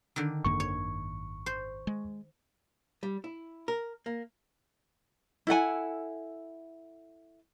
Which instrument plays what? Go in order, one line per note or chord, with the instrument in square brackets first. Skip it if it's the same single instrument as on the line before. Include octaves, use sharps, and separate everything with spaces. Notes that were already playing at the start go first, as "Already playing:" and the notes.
[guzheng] D3 D#3
[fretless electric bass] G#1 F#2 A#3 [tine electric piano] C#6
[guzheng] C#5
C5
[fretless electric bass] G#3
[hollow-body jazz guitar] G3
E4
A#4
A#3
[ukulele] E4 A4 F#5 G#5